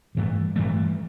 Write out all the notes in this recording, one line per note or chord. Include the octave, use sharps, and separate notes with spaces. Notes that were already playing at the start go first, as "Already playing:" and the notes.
A1 G2 E3 A3
A1 G2 E3 A3